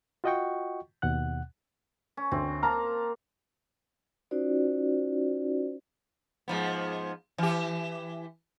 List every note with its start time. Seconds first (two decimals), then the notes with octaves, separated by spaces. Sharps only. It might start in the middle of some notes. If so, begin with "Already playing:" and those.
0.24 F4 F#4 D#5 F#5 G5 C#6
1.02 D#2 B2 F#5 F#6
2.17 C#4
2.32 D2 C4
2.63 A#3 A5 A#5 F6
4.31 C#4 D#4 F4 F#4 C5 D5
6.48 G#2 F3 B3
7.38 E3 G4